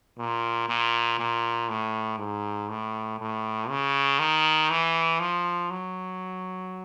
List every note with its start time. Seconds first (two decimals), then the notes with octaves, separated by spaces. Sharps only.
0.18 A#2
0.69 A#2
1.19 A#2
1.69 A2
2.18 G#2
2.69 A2
3.20 A2
3.69 C#3
4.19 D#3
4.71 E3
5.20 F3
5.71 F#3